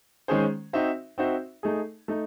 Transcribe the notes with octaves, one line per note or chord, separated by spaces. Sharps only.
D#3 G#3 C#4 G#4 C5
C4 D#4 F#4 C5 E5
C4 D#4 F#4 C5 E5
A3 D#4 G#4
A3 D#4